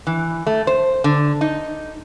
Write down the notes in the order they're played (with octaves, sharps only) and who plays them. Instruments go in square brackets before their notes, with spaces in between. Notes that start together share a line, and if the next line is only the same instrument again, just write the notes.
[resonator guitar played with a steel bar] E3
A3
C5
D3
D#4